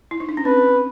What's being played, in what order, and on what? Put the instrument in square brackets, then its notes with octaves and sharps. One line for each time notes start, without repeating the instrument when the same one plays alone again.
[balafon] E4
D#4
D4
C#4
[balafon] C4 [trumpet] B4